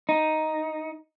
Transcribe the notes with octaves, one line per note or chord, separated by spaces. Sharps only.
D#4